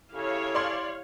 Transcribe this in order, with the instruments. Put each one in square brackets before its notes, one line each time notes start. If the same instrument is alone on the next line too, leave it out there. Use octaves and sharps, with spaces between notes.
[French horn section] C#3 A4 [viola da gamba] E4 G4 [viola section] C#5 F5
[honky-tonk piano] D5 C6 G#6